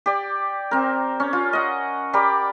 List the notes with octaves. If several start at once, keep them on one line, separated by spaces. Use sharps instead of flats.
G4 D5
C4 A#4
C#4
F4
D#5 F#5
G4 A#4 D5 B5